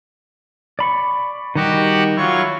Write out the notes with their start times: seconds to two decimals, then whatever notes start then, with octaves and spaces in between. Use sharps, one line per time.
0.79 D5 B5 C#6
1.55 D#3 G3 F#4 G4 D#5 F#5
2.17 F#3 E4 F4 C#5 C#6